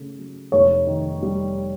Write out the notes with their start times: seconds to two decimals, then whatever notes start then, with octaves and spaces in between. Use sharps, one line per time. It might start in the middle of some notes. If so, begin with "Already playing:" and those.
Already playing: C#3 A3
0.19 F#3
0.52 F1 C#5
0.87 D#3
1.22 G3